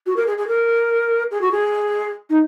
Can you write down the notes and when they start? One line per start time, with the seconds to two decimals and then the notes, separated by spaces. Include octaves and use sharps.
0.06 F#4
0.16 A#4
0.27 G#4
0.38 G#4
0.48 A#4
1.31 G#4
1.41 F#4
1.51 G#4
2.29 D#4